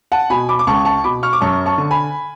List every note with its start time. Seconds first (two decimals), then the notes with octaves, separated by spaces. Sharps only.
0.12 F#5 A5
0.30 B2 G#5 B5
0.49 B5 D6
0.59 D6
0.67 C#2 A5 C#6
0.85 A5 C#6
1.04 B2 B5 D6
1.23 C#6 F6
1.33 D6
1.41 F#2 A5 C#6
1.66 A5 C#6
1.78 D3
1.91 G#5 B5